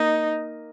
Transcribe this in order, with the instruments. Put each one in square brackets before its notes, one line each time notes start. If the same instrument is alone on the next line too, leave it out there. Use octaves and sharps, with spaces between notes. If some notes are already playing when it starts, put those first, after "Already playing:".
Already playing: [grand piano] A#3 [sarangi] D#4